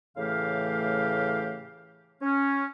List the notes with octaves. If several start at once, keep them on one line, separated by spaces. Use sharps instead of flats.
A2 C#3 E3 A3 G4 F5
C#4